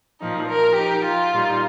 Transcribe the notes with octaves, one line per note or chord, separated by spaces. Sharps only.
A#2 F3 D#4
A#4
F3 D#4 G4
F4
A#2 G3 D#4